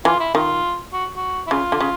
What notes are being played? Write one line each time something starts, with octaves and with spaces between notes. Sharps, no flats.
E3 F4
E4
D#3 F4
F#4
F#4
E4
C#3 F4
D3
C#3